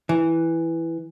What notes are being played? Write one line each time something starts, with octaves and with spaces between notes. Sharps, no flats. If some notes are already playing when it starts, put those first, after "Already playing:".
E3